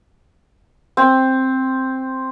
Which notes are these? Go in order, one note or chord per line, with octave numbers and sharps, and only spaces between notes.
C4